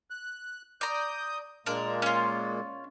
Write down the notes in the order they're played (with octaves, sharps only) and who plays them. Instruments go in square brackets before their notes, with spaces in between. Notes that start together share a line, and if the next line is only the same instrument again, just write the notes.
[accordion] F#6
[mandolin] D5 A#5 [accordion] D#6 G6
[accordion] A#2 G#3 A#3 [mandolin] D4 A#4
[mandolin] C#4 F4